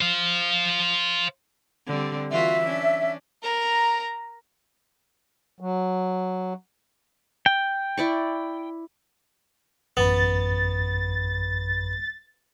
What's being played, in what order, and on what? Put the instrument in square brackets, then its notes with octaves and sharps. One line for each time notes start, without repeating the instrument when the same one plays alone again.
[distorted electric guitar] C5 F5
[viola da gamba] D3 G3 C4
[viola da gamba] E3 F4 F#4 [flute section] E5
[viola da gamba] C#4 D4
[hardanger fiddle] A#4 A#5
[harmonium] F#3
[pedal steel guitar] G5
[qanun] E4 D5 C#6
[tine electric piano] A1 F#2 B5 [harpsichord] B3 [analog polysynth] A6